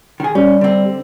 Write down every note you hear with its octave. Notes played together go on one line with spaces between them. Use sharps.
D#3 G#4
G3 C#4
D3 C4